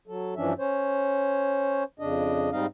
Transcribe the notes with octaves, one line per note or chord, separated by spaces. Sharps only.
F#3 A4
G2 E3 F3 C#4 D4 E5
C#4 C5 C#5
F2 C#3 D4 D#5
G#2 G3 C4 D#4 D#5 F5